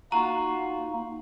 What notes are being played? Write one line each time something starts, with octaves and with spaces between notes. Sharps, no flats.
A#3 D#4 F4 F#4 A#5